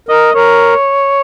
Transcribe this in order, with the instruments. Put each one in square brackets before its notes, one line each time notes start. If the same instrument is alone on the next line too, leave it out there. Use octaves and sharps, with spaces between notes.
[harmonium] A#4 [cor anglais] D#5
[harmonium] A#4 [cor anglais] C#5